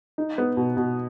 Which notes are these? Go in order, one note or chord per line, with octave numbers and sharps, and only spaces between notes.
D#4
B3
B2
B2